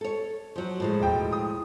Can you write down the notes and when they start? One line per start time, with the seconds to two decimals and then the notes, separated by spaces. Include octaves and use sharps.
0.01 A4 C#5
0.56 F3 F#3
0.80 A2 F3 G#3
1.00 E1 G5
1.32 D#6